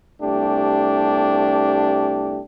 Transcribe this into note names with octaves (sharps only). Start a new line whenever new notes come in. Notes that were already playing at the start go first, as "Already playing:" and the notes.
C2 A3 D4 G4